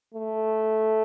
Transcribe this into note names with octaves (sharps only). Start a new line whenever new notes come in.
A3